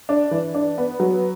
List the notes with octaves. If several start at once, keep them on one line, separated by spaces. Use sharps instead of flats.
D4
E3
D4
B3
F#3